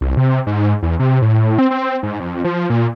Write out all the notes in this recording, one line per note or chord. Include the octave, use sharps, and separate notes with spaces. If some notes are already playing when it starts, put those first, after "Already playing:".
C2
C3
G#2
E2
C3
A2
C4
C4
G#2
F2
F3
A#2